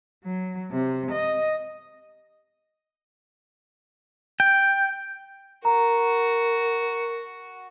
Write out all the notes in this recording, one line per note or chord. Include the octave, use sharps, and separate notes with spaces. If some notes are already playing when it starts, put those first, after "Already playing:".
F#3
C3
D#5
G5
F#4 A#4 A#5